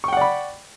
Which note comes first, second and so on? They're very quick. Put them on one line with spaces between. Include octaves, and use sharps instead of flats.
C#6 G5 F#5 D5 B5